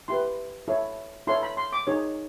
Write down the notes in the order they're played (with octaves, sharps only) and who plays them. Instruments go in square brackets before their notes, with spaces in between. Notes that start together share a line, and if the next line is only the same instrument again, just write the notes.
[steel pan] E4 G4 B4 C6
E4 A4 C#5
E4 A4 C#5 C6
B5
C6
D6
D#4 G#4 C#5